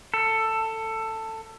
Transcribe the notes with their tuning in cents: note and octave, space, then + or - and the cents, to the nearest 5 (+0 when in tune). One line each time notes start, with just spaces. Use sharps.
A4 +15